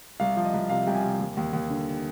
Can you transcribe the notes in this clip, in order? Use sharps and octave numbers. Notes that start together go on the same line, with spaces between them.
C2 F5
F3
D#5
C2
C3 F5
C2 G5
G#5
C3
D#2
D#2
D#2
D3